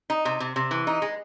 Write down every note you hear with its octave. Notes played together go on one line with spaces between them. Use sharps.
D#4
C3
C3
C3
E3
D#4
G#3